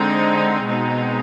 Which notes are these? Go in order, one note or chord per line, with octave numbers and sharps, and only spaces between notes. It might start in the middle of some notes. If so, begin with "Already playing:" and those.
Already playing: D3 G#3 C4 D#4
B2 G#3 C4 D#4